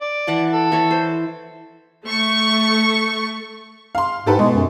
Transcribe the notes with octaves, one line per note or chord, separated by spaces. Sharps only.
D5
E3 F#5 A5
A4
E3 C#5
C5
A3 C#6
F5 C6
G#2 G4 A4 B4
B2 G#3
F#2